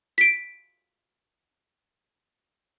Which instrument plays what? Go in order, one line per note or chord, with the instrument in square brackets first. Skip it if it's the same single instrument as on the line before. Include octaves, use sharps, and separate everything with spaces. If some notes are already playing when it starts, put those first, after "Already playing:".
[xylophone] B6 D7